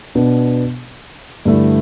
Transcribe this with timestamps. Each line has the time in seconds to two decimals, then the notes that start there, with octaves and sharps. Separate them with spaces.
0.15 B2 B3 D4
1.45 G2 D3 A3 E4